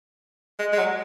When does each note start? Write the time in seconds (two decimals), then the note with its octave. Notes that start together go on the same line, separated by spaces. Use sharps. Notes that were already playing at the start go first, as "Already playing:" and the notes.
0.59 G#3
0.73 G#3
0.78 F#3